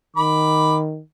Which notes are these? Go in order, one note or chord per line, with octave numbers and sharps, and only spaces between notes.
D#3 B5 D6